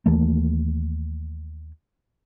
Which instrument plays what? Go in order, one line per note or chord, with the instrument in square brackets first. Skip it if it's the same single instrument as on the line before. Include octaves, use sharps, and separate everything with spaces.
[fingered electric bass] D#2 E3 A3 A#3